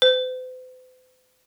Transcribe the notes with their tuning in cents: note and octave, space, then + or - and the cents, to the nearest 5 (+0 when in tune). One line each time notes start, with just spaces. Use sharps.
C5 -45